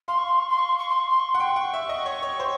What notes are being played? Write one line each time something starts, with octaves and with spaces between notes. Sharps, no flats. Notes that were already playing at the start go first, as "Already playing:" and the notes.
F5 C6
C#6
C6
C#6
C6
C#6
C6
C#6
C6
C#6
C6
C#6
C6
F#5
G5 C#6
F#5
E5
D#5
C#5
C#5
C5